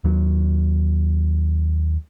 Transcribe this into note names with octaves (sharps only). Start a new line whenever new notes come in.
D#2 F#3